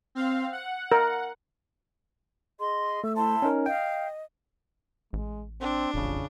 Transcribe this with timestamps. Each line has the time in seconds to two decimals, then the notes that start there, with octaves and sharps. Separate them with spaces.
0.15 C4 F5
0.52 F#5
0.92 A#4
2.60 G#4 D#5 C6
3.04 A3 E6
3.16 E4 C5 A5 C6
3.42 C#4 D#4 A#4
3.66 D#5 F5 G5
5.13 A1 G#3
5.61 C4 D4
5.94 D#1 A1 F2 C#3